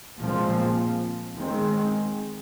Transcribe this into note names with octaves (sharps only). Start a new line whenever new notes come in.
A#2 F3 G#3 C4
D#3 G#3 C4